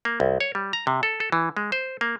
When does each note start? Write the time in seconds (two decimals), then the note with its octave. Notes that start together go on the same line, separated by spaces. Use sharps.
0.05 A#3
0.20 C2
0.40 C#5
0.55 G3
0.73 A#5
0.87 C3
1.03 A4
1.20 A4
1.32 E3
1.57 G#3
1.72 C5
2.01 A#3